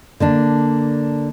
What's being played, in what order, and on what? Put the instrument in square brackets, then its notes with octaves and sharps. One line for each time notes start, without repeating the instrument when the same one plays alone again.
[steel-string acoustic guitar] D3 A#3 D4